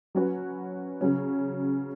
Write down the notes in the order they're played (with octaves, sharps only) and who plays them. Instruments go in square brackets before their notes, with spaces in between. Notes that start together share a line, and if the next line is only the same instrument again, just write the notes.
[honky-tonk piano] F#3 C#4 F#4 B4
C#3 F#3 C#4